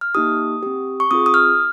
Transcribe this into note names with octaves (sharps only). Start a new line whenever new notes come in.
F6
A#3 D#4 G4 D#6
C4 G4
C#6
C4 F4 G#4 D#6
D#6
F6